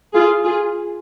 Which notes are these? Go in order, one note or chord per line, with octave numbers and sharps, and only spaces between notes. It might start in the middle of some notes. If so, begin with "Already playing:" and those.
F4 G#4
F4 G#4